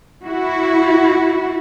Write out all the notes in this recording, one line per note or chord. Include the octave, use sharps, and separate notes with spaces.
E4 F#4